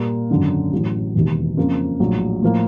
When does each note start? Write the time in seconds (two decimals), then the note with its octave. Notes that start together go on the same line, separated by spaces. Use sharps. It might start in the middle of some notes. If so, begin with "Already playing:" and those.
Already playing: A#2 G3 A#3
0.30 G#1 F#2 D3 F#3
0.73 A1 A2 F#3
1.15 E1 D#2 D#3
1.57 F2 C#3 F3 A#3 C#4
2.00 A#1 A2 F#3
2.42 A2 F3 A#3